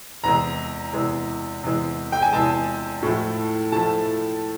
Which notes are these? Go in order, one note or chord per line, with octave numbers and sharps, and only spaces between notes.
E2 C3 E3 G#3 A#5
E2 C3 E3 G#3
E2 C3 E3 G#3
G5
G#5
E2 C3 E3 G#3 A5
A2 F3 A3
A2 F3 A3 A5